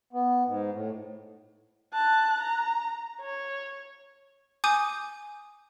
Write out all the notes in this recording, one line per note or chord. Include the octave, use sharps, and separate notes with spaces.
B3
G#2
A2
A5 F#6
A#5
C#5
G#5 D6 D#6 G6 D#7